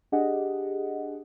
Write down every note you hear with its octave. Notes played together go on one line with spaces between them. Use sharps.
D4 G4 G#4 D#5 F#5